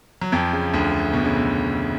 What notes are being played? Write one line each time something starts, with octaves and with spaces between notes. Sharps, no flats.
F#3
F2 F3
C#3
D2 D3
B2
C#3
B2